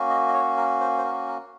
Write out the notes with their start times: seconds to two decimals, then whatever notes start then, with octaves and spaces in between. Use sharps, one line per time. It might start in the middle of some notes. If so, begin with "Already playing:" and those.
Already playing: A#3 C#4 F#4
0.10 D#5
0.28 D#5
0.34 C#5
0.57 A#4
0.80 C5
0.98 C5
1.04 A#4
1.28 A#4